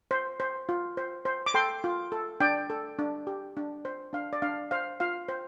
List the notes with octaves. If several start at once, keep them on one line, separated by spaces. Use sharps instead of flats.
C5
C5
F4
C5
C5
D6
A4 G5 C6
F4
A4
D4 D5 G5
A4
D4
G4
D4
C5
D4 F5
D5
D4 F5
C5 F5
F4 F5
C5